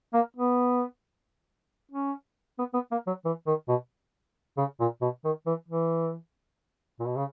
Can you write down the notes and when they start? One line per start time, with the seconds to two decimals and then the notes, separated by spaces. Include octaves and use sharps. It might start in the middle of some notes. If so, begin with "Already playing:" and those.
0.14 A#3
0.37 B3
1.92 C#4
2.58 B3
2.74 B3
2.92 A#3
3.07 F#3
3.25 E3
3.47 D#3
3.68 B2
4.57 C#3
4.80 A#2
5.02 B2
5.24 D#3
5.46 E3
5.68 E3
7.00 A#2
7.07 B2
7.16 C#3